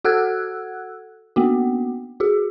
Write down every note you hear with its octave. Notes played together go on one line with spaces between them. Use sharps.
F#4 A4 F#5 E6 F#6 G#6
A#3 B3 F#4
F#4 G#4